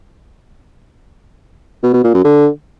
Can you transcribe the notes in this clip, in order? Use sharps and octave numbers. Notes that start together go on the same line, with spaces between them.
B2
B2
A#2
F#2
D3